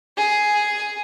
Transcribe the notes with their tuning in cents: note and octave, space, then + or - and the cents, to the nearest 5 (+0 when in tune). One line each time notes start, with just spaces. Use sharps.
G#4 +5